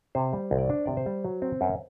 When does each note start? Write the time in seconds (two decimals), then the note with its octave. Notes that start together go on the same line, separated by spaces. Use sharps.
0.15 C3 C5
0.33 G3
0.51 C2
0.58 D5
0.70 D4 C5
0.86 C3 D5
0.97 C5
1.06 G3
1.24 F#3
1.42 C4
1.61 F#2